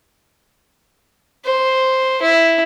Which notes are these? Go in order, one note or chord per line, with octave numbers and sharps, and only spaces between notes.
C5
E4